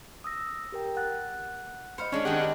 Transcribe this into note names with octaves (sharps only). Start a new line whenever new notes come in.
D#6 E6 A#6
G4 A#4 G5
F#5 F#6 A6
C5 D#5 F5 B5 C#7
G#3 C#4 D4 D5 F6
D#3 C4 D4 G4 G#4 F#5